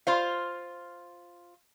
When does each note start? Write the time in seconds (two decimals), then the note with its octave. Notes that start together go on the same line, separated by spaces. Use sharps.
0.07 F4 C5 F5